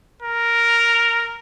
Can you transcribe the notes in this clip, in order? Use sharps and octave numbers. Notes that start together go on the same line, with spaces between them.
A#4